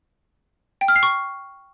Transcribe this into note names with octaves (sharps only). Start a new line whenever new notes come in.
G5
F6
C7
C#6